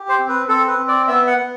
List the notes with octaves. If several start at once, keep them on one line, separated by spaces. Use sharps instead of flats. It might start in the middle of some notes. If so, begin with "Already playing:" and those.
Already playing: G4
C5
C4
B4
C4 A4
B4
C4
D5
B3 E5
F#5
B3